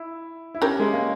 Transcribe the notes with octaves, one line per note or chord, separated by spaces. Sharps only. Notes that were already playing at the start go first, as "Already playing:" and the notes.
Already playing: E4
E4
C#4 G4 A#4
G#3
A#3